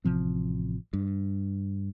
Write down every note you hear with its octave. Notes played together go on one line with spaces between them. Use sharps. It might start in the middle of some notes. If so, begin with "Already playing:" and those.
A1 C3 F3 C4
G2